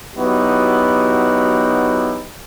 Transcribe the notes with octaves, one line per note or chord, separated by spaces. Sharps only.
F#3 B3 D#4 E4 F#4 G4